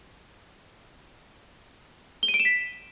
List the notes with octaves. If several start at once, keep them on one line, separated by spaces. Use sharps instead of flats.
G7
D#7
D7
E7
B6